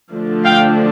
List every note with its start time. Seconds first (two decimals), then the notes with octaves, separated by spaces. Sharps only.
0.12 D3 F3 A3 D4
0.44 F5 G5